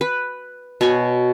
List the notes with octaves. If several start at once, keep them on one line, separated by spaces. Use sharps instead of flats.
B4
B2 C#5 G#5 B5